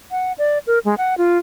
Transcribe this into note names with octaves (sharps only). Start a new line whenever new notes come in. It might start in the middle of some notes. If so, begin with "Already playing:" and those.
F#5
D5
A#4
G#3
F#5
F4